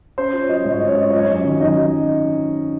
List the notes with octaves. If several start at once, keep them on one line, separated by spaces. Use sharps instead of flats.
C#4 C5
F4
C#5
F#3 D#5
C#5
G#2 D#5
C#5
C#4 D#5
C#5
F4 D#5
C#5
F#3 D#5
C#5
D#5
F#2 C#4 C#5
D#3
F#2 D#4 D#5
F#3